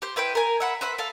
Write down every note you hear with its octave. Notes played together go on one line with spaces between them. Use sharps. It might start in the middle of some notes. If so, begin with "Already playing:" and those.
G4 C5
E4 B4 C5 G5
A#4 G#5
E5 F#5 B5
B4 C5 E5 B5
A4 F5